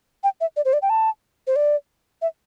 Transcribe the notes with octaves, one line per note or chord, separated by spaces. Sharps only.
G5
E5
D5
C5
D5
G5
A5
C5
D5
E5